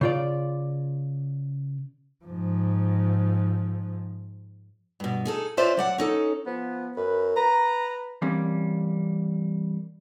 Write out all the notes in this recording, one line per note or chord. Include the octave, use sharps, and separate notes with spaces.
C#3 F4 D5
G#2 F3
G2 B2
D#4 G#4 A4
C#4 F4 B4 C5 D5 E5
F#3 D5 F#5
C#4 D#4 A4
F3 B3
F#2 B4
B4 A#5
E3 G3 A#3 C4 C#4